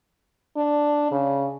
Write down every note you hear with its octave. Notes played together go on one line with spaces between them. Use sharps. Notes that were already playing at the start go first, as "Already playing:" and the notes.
D4
C#3